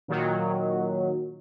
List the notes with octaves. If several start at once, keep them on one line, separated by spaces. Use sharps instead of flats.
A#2 D#3 F#3